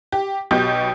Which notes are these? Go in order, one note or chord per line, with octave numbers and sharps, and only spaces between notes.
G4
B1 B2 G4 G6